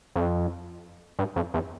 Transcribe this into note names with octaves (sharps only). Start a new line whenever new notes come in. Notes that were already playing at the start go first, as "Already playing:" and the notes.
F2
G2
F2
E2